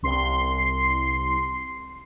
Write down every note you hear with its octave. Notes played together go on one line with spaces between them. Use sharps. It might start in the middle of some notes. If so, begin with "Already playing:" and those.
C2 C6 C7